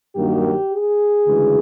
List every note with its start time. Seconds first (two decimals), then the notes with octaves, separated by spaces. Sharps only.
0.15 G2 D#3 F#3 A#3 G4
0.71 G#4
1.27 D2 C#3 E3 G#3